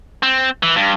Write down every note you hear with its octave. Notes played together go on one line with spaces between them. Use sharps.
C4
E3
G2